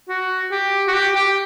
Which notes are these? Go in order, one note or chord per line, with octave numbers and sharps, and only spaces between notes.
F#4
G4
F#4
G4
G4